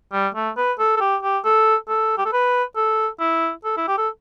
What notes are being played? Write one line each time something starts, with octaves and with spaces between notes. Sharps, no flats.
G3
A3
B4
A4
A4
G4
G4
A4
A4
G4
A4
B4
A4
E4
A4
E4
G4
A4